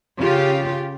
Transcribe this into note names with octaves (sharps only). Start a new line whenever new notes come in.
C#3 F4 G4